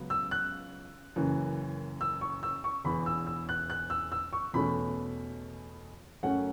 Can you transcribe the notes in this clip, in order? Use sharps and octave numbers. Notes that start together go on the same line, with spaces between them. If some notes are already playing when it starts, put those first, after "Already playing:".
Already playing: C#2 C#3 F#3 B3
E6
F#6
F#1 F#2 E3
E6
C#6
E6
C#6
E1 E2 E3 B5
E6
E6
F#6
F#6
E6
E6
C#6
E2 B2 A3 C#4 B5
F#2 F#3 A3 C#4 F#5